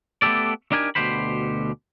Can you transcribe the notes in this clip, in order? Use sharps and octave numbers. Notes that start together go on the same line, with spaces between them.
A3 B3 C4 G4 A4 D5
D4 D#4 G4 A#4 G#5
D2 G#2 B2 G4 C5 B5